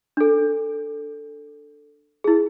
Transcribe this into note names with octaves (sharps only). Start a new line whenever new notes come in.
D4 A4
E4 G#4